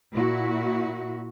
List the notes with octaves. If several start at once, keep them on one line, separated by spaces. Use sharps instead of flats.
A#2 E4 F#4